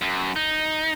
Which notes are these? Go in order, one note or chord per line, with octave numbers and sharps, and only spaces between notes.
F#2
D#4